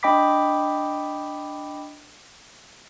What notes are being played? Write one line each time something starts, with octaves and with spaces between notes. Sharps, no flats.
D4 D#5 G5 B5 D6 B6